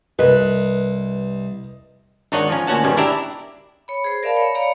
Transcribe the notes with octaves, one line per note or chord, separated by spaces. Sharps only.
C2 B4 D#5
G#1 D4 D#4 C#5 D#5 F#5
F3 C#4
D2 A#2 C#4 F#4 F#5 A5
G#1 B2 D#3 G3 C#4
D4 E4 G4 D5 E5 A#5
C#5 B5
G#4 C5
A#4 D5 E5 F5 A5 B5
C#5
C#5 D5 F5 A#5 B5